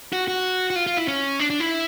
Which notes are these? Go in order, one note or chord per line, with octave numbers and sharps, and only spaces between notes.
F#4
F#4
F#4
F4
F4
E4
C#4
D4
D4
E4